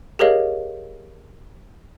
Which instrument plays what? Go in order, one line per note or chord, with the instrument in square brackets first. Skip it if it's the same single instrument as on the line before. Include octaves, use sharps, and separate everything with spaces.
[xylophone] G4 G#4 A#4 C#5 D#5 F5